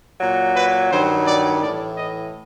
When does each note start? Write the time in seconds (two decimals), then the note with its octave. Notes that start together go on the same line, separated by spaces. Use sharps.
0.21 A#2 F#3
0.55 B4
0.91 G2 D#3 F#3 C5
1.27 D5
1.62 A2 E3 D5
1.97 D#5